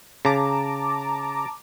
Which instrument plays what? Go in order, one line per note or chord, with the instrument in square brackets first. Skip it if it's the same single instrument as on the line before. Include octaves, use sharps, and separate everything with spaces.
[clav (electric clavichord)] C#3 [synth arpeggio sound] A5 A#5 D6